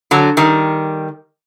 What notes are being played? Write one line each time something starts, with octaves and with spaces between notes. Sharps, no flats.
D3 F#3
D#3 G3